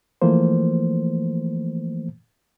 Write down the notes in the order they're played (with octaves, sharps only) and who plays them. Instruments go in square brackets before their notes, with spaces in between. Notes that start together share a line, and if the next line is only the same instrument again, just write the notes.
[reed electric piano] E3 F3 A3 A#3 C5